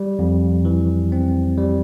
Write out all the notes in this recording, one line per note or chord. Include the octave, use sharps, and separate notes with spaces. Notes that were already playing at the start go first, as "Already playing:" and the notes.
Already playing: G3
F2
E3
C4
G3